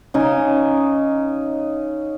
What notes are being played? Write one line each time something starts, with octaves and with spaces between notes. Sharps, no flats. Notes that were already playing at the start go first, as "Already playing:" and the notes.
C#3 D#4 G#5